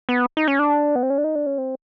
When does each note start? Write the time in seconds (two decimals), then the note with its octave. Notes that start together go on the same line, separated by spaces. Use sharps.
0.09 B3
0.37 D#4
0.48 C#4
0.59 D4
0.95 B3
1.03 C4
1.10 C#4
1.18 D4
1.24 D#4
1.35 D4
1.46 C#4
1.58 C4